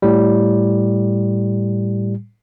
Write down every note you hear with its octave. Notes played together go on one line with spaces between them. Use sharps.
A2 G3